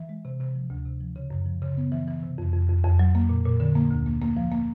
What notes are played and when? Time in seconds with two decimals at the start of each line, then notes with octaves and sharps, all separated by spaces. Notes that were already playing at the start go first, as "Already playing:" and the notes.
Already playing: E3
0.09 G#3
0.25 C3
0.40 C3
0.55 F3
0.70 D2
0.85 C3
1.00 F3
1.16 C#3
1.31 F#2
1.46 F3
1.62 C#3
1.77 B3
1.92 E3
2.08 E3
2.23 C3
2.38 F2
2.54 F2
2.69 F2
2.84 F2
2.99 F#3
3.15 A#3
3.29 A#2
3.45 A#2
3.60 D3
3.75 A#3
3.90 D2
4.06 A#3
4.22 A#3
4.37 F3
4.52 A#3